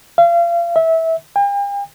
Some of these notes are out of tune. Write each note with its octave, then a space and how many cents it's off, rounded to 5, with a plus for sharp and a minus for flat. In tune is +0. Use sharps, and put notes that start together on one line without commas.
F5 -35
E5 -20
G5 +45